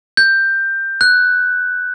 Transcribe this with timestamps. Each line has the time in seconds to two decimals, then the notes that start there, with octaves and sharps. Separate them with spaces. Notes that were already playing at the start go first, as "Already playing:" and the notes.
0.17 G6
1.01 F#6